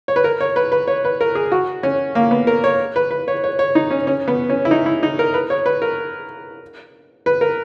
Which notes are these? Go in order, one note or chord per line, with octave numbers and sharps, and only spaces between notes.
C#5
B4
A#4
C#5
B4
B4
C#5
B4
A#4
G#4
F#4
C#4
A#3
B3
A#4
C#5
B4
B4
C#5
C#5
C#5
D#4
C#4
C#4
B3
C#4
E4
D#4
E4
D#4
A#4
B4
C#5
B4
A#4
B4
A#4